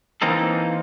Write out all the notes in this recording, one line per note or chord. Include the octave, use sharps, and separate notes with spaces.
E3 A#3 C4 D#4 A4